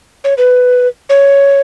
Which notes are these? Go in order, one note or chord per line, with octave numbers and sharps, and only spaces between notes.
C#5
B4
C#5